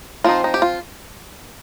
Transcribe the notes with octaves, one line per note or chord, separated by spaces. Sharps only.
F3 C4 D#4 F4
D#4
G4
F4